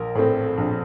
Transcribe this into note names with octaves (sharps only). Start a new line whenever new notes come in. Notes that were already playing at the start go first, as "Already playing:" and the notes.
Already playing: A#1 A#4
A2 A3 C4
A#1